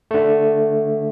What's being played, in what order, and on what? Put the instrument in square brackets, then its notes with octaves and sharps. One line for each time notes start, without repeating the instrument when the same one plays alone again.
[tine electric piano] D3 A3